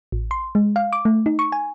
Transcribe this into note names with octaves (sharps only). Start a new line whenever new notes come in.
A1
C6
G#3
F5
D6
A3
D#4
C#6
G#5